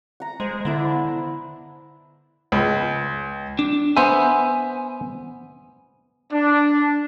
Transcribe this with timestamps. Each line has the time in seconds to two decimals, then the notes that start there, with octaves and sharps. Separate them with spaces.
0.20 F#5 A#5
0.40 G#3 C5
0.65 D3 B3 E4 A#5
2.52 C#2
3.59 D4
3.97 B3 C5 E5 G#5
6.33 D4